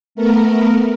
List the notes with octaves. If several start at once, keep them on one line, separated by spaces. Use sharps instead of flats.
A3 B3 A#4